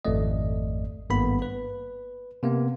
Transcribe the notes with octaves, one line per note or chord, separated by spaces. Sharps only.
G#1 F2 A3 D5 D#5
G#1 G2 A#3 B3 B5
B4
C3 A#3 B3